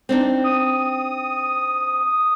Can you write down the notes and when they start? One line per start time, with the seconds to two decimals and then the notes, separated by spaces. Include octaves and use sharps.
0.09 C4 D4 D#4
0.44 D#6